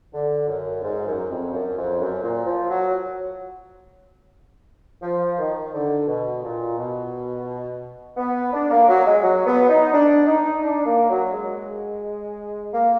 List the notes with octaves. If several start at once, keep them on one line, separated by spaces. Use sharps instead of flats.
D3
F#2
G#2
F#2
F2
F#2
F2
F#2
A#2
F3
F#3
F3
D#3
D3
B2
A#2
B2
B3
D4
A#3
F#3
G#3
F#3
B3
D#4
D4
D#4
D4
A#3
F#3
G#3
A#3